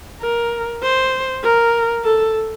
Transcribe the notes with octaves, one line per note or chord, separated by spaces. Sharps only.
A#4
C5
A#4
A4